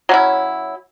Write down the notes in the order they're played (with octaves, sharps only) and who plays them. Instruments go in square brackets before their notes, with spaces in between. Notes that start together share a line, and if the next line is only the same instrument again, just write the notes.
[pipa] F#3 C#4 E4